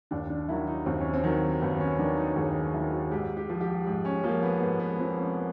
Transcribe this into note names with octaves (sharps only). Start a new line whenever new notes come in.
D#2 D4
D4
D#3 F#3 E4
D#4
D#2 C4
C#4
C4
D#3 F#3
D#2 B3
C#4
D#3 F#3 D4
D#4
D#2 G#4
F#3 E4
D#3
F#4
G#2 G4
G4
F3
G4
G#2
C#4
F3 A#3
B3
G#2 B3
B3
F3 C4
C#4
B3